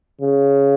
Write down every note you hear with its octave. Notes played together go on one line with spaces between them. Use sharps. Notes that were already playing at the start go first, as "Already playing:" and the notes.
C#3